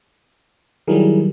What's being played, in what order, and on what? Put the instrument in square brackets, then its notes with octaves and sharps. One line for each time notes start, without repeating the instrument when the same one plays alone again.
[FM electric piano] D#3 F#3 G3 [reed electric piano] E4 G#4 A#4